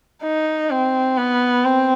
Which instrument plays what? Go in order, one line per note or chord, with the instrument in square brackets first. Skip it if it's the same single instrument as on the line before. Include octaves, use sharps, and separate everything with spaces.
[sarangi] D#4
C4
B3
C4